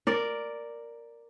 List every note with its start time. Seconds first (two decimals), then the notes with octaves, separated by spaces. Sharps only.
0.07 A#4 D5